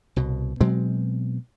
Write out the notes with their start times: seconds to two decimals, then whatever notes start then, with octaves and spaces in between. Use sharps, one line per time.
0.16 C2 B2
0.61 B2 F#3 G#3 C4